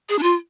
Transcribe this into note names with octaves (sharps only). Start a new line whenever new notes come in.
G#4
D4
F4